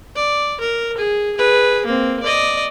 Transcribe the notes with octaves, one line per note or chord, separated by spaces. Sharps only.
D5
A#4
G#4
G#4 B4
A#3 C4
D5 D#5